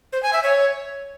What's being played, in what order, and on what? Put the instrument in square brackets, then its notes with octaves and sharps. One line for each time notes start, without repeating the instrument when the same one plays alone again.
[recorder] C5
G#5
E5
C#5